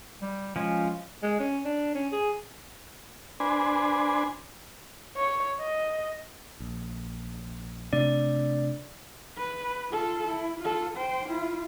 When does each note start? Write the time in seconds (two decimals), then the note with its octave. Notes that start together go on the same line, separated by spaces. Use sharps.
0.22 G3
0.56 F3 G#3 C#4
1.23 G#3
1.40 C#4
1.65 D4
1.95 C#4
2.12 G#4
3.40 D4 B4 C5 G#5
5.16 C#5
5.61 D#5
6.60 A#1
7.93 C3 A3 D4 D5
9.37 B4
9.92 F4 A4
10.28 E4
10.60 F4 A4
10.97 C5 G5
11.29 E4 F4